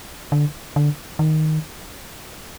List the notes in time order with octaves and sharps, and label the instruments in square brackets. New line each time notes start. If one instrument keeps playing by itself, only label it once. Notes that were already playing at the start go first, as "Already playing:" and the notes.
[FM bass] D3
D3
D#3